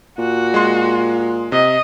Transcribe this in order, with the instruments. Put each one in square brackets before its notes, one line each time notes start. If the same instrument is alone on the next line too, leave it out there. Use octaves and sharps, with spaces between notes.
[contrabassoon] A#2 [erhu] F#4
[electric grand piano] G#3 C6
[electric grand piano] C3 [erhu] D#5